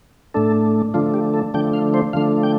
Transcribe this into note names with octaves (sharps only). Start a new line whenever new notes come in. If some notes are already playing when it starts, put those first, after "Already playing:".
A2 A3 D4 A4
D3 F3 A3 D4 F4
G4
A4
D3 F3 A3 D4 G5
F5
C5
D3 F3 A3 D4 F5
G5